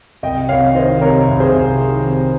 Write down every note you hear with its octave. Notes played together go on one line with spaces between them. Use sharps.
C2 D#5 G5
C2 C#5 F5
D#3 C5 D#5
C3 A#4 C#5
C2
G#4 C5
C2
D#3
C3